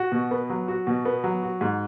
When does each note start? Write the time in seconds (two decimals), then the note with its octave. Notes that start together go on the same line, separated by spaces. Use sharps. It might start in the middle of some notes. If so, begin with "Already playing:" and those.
Already playing: F#4
0.12 B2
0.31 B3
0.50 F#3
0.68 F#4
0.87 B2
1.05 B3
1.24 F#3
1.43 F#4
1.61 G#2